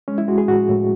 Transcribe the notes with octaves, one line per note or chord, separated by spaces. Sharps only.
G#3 C#4
E4
G#3 F#4
G#4
A2 F#4
A2